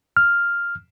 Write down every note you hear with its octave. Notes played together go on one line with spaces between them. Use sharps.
F6